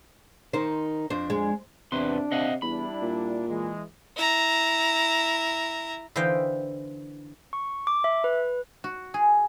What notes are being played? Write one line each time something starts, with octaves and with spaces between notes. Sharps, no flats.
D#3 D#4 C5
F2 D4 C5
G#3
E2 C3 D4 B4 C6
C3 D#5 F5 F#5
E2 G3 D4 E4 B5
A#2
E3 G#3
E4 A#5
D3 E3 C5 D#5 F5 G5
C#6
D6
E5
B4
F#4
G#4